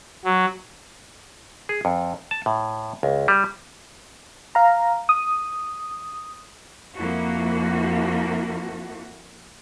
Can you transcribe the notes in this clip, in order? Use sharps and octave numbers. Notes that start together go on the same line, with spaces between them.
F#3
G#4
F2
A5
A2
C#2
G3
F5 A#5
D#6
F2 F3 A#3 E4 F#4